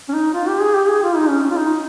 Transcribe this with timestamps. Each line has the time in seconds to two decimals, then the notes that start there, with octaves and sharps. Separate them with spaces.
0.09 C#4
0.14 D#4
0.34 F4
0.48 G4
0.61 G#4
0.75 G4
0.89 G#4
1.03 F4
1.16 D#4
1.30 C#4
1.44 C#4
1.51 F4
1.57 D#4